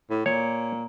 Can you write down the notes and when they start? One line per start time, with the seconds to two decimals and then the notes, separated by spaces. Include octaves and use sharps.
0.10 A2
0.26 A#2 C#5